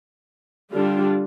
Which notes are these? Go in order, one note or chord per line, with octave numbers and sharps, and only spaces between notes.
D3 G3 D4 F4